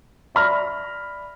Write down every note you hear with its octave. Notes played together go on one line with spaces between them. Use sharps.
D5 E5 B5 F6 A#6